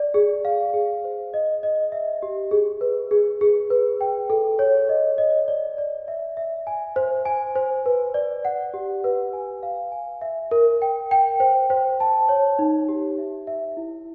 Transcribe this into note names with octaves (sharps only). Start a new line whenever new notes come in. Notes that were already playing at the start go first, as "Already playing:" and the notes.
Already playing: D5
G#4
F5
G#4
C5
D#5
D#5
E5
G4
G#4
B4
G#4
G#4
B4
G5
A4
C#5
D#5
D#5
D5
D5
E5
E5
G#5
C5
G#5
C5
B4
D5
F#5
G4
B4
G#5
F5
G#5
E5
A#4
G5
G5
C5
C5
A5
C#5
D#4
G4
E5
E5
E4